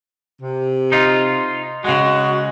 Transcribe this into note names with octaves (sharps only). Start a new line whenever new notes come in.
C3
D#4 F4
C#3 G#3 F#4